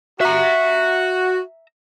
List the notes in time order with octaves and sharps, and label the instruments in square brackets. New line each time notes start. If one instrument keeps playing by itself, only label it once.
[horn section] F#4 [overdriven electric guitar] E5 A#5